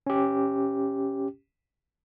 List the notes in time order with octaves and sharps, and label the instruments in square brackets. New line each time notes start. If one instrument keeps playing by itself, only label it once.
[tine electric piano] C#4 G4